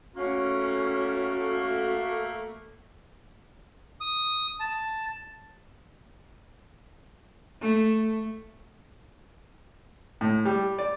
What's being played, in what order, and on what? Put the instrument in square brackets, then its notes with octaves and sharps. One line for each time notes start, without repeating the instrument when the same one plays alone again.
[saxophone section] A3 A#3 [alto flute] C#4 [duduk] F#4
[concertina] D#6
A5
[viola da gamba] A3
[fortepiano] A2
G3
D5